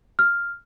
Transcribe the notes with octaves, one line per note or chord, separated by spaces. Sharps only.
F6